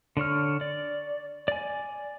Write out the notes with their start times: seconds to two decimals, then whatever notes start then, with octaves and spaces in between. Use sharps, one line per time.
0.17 D3 D4 C#5 F6
0.61 D5
1.48 D5 G#5